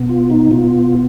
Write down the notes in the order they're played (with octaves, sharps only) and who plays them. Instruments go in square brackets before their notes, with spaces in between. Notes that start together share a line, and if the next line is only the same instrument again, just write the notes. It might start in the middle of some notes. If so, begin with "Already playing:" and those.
Already playing: [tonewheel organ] B2 B3
F4
D#4
B2 B3 F4